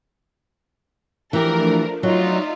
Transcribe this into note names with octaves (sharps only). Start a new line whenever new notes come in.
E3 F3 A3 D4 G4 A#4
F#3 D#4 F4 D5 E5